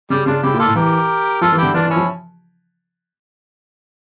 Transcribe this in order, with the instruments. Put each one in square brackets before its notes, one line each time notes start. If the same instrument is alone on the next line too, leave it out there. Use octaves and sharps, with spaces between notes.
[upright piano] C#3 [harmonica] G3
[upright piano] C#3 [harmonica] D4 F4
[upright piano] C#3 [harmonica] E4 G4
[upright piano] A#2
[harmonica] F4 A4
[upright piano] A2
[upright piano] E3 [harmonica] G4 A#4
[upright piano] F3 [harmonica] F4 A4
[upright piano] E3
[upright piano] D3 [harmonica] E4 G4
[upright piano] E3 [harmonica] D4 F4
[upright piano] E3
[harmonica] C#4 E4
[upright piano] F3